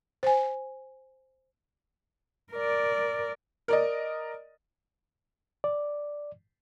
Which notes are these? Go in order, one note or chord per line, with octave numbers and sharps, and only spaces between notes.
C5 G#5
A#4 D5
A#4 D5 D#5
D5